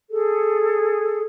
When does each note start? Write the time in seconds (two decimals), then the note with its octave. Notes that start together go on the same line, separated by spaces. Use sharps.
0.10 G#4 A4